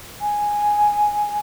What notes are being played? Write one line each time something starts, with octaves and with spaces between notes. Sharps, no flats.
G#5